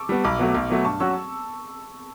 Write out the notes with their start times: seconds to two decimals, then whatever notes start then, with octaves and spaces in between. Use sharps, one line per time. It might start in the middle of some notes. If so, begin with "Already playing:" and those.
Already playing: A5 C#6 D6 E6
0.09 G3 B3
0.24 B1 B5 D6
0.39 B2 F#3 A3
0.54 B1
0.70 B2 F#3 A3
0.85 G2 A5 C#6
1.00 F#3 C#4 F#4 C#6 E6